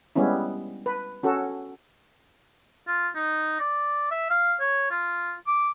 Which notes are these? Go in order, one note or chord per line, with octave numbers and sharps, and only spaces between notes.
G3 G#3 B3 C#4 E4
B4
C#4 F#4 A4
F4
D#4
D5
E5
F5
C#5
F4
D6